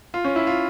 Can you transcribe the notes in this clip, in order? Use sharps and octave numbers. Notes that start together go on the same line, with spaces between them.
F4
C#4
E4
F4